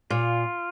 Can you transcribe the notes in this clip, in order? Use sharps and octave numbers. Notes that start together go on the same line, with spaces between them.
A#2 F4